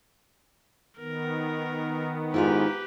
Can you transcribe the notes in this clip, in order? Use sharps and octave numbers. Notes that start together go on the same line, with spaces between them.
D#3 B3 A#4
G#2 E4 F4 G4 B4 F5